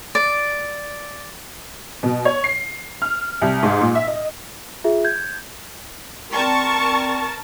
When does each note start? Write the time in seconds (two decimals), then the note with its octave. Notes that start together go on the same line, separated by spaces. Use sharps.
0.15 D5
2.03 B2
2.25 C#5
2.44 C7
3.02 F6
3.41 C2
3.63 G#2
3.81 A#2
3.95 E5
4.07 D#5
4.84 F4 G#4 E5
5.05 G6 G#6
6.32 C4 A#4 D5 G5 A5 C#6